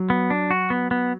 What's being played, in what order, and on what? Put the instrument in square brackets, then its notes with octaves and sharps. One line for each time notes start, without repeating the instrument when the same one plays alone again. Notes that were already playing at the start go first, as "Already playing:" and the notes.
Already playing: [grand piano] F#3
[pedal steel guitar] B3
D4
F#4
B3
B3